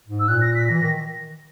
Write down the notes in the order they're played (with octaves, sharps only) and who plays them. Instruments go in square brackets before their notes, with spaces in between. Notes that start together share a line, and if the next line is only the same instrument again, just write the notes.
[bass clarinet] G#2
[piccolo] E6
[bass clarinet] A#2 [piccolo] F#6
[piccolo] A#6
B6
[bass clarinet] E3 [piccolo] A#6
[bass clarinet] D#3 [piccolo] A#6